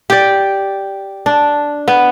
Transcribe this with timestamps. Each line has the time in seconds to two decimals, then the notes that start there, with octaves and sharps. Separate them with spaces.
0.10 G4 D5
1.26 D4
1.88 B3